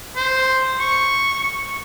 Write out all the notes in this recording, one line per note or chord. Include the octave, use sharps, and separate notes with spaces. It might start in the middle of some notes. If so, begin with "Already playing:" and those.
C5
C#6